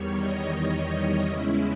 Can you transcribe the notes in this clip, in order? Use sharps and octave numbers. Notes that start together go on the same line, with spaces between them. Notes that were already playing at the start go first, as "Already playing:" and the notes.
Already playing: E2 D#3 G3 C#5
D#5
E2 C#3 G#3 C#4 E4